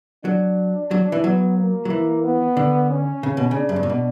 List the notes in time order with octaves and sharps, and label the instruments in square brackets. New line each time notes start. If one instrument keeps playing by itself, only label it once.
[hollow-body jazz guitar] F#3 [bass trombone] D4
[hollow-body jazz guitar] F#3
E3
[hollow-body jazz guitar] F#3 [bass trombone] B3
[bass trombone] A#3
[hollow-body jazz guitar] F#3
E3
[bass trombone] B3
[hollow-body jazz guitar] D3
[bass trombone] C#4
[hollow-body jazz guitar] C#3
B2
C#3
[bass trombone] D4
[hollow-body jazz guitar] F#2
G2
A#2
B2